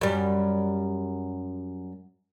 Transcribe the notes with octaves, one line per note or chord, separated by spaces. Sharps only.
F#2 G3